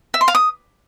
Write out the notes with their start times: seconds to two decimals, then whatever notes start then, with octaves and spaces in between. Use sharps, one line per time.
0.14 E5
0.21 C6
0.28 F5
0.35 D#6